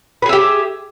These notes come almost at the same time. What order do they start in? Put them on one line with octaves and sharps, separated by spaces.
B4 G#4 E5 G4